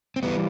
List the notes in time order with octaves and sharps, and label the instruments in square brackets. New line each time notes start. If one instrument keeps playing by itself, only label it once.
[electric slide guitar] C4
E3 G3 B3